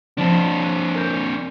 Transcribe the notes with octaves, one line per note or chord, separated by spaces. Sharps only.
F3 C4 D4 A5 B5
G#5 F#6
A#4 G6